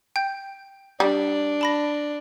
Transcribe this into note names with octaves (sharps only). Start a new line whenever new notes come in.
G5 G6
G3 D4
A5 B5 A#6